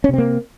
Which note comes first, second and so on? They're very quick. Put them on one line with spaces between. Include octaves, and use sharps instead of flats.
C#4 C3 C4 A#3